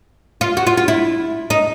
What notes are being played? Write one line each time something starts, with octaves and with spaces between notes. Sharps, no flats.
F4
F#4
F4
F4
E4
D#4